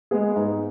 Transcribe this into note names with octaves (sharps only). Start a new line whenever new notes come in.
G#3 B3 G#4
G#2